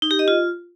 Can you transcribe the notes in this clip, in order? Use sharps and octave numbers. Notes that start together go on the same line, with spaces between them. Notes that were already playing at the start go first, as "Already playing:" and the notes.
D#4
G4
D#5
F4